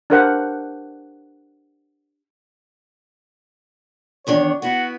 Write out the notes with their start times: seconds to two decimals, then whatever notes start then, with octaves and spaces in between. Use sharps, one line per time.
0.10 D4 G4 A#4 C5 F#5
4.27 E2 D#3 D4 C#5
4.62 B3 E4 F#4